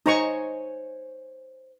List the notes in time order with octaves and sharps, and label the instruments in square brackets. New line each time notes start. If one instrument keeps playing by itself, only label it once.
[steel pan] D#4 A#5 C#6 [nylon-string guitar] C5 C#5 G#5